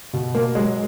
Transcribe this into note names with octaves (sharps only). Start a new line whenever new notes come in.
B2
A#3
F#3 G#3